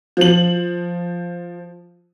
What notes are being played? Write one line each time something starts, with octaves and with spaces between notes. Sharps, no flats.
F3 F#7